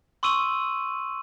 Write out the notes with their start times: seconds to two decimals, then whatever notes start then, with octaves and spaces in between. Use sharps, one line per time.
0.23 C6 C#6 D#6 E6 D#7 F#7